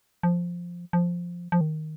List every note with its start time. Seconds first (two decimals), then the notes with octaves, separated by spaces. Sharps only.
0.23 F3
0.93 F3
1.52 F3
1.61 D#3